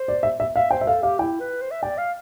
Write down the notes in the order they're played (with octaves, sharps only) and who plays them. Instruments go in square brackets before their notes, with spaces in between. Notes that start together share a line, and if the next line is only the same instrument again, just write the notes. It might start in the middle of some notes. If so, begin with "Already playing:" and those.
Already playing: [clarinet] C5
[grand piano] D5
E5
E5
[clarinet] E5 [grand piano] F5
[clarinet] C5 [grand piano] G5
[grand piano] E5
[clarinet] A4 [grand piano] F5
[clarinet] G4 [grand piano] F5
[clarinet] E4 [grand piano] G5
[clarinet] B4
C5
E5
[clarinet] D5 [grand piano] G5
[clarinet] F5